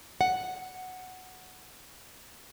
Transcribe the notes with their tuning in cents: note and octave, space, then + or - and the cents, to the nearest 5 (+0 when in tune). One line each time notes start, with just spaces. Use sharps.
F#5 +0